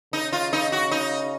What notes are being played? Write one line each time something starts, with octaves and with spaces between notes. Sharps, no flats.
C#3 D#4
F4
D#4
F#4
D#4